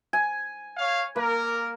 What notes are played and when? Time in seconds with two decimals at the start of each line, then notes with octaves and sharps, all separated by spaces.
0.13 G#5
0.77 C#5 F5
1.16 A#3 A#4